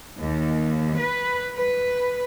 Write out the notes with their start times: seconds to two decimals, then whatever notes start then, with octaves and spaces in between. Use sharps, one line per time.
0.18 D#2
0.95 B4
1.56 B4